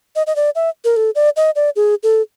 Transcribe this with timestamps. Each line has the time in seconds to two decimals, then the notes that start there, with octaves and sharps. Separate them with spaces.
0.16 D#5
0.27 D#5
0.36 D5
0.55 E5
0.85 A#4
0.96 A4
1.15 D5
1.36 D#5
1.56 D5
1.76 G#4
2.03 A4